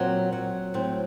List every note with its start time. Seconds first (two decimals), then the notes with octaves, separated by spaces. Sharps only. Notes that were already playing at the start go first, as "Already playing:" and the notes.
Already playing: A#2 F#3 C4
0.33 F#3
0.74 A2 C4